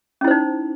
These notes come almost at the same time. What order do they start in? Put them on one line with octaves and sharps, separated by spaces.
C#4 E4 C5 D#4